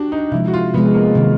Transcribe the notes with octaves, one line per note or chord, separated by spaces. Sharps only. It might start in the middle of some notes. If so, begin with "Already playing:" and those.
Already playing: D4 F#4 G4
D#4
C3 F3 G#3 E4
F#4
F4
C3 F3 G#3 B3
A#3
C3 D#3 F#3